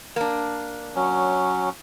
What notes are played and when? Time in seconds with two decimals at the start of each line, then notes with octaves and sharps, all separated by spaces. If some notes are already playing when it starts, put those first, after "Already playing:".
0.16 A#3 D4
0.96 F#3 C#4